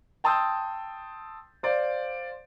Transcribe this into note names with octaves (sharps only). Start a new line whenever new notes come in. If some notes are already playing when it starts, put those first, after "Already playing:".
G5 A5 C6 D#6 E6 G6
C5 D5 F5